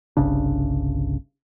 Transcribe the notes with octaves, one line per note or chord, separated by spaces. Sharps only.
G1 C2 C#3 D4